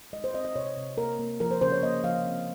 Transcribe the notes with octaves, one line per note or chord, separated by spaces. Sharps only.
G#3 D#5
C5
C4 D#5
D#5
C3 C#5
C3
A#3 A#4
A#3
F3 A#4
C5
C#3 C5
C#5
A#3 D#5
F3 F5
C4